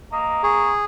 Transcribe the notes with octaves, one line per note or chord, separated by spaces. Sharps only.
A#3 D#5
G#4 C#6